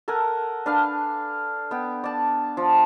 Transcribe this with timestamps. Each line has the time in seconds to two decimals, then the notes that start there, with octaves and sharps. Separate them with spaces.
0.08 A4 A#4 F#5 G#5
0.66 D4 B4 F5
1.71 B3 G5
2.04 D5 A5
2.57 F3